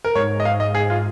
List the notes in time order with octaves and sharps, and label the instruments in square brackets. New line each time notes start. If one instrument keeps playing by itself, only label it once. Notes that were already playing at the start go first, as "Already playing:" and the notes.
[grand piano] A#4
[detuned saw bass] G#2 [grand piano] C#5
[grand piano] D#5
F5
D#5
G#4
F4